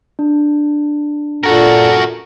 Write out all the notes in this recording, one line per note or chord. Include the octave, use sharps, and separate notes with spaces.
D4
A#2 F#4 A4 A#4